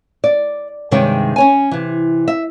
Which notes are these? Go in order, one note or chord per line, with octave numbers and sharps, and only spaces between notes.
D5
G2 C3 D#3 G#3 C#5 G5
C#4 C#5 G#5
C3 E3
E5